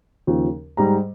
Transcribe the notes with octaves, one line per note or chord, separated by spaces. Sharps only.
D#2 C#3 F3
G#2 G3 A#5